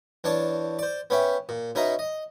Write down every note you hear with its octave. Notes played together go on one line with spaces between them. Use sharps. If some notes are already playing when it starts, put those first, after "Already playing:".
E2 D4 C#5 A5
C5 D5
B3 C#4 G4 E5
A#2
B2 C#4 D#4 D#5 E5 A#5
D#5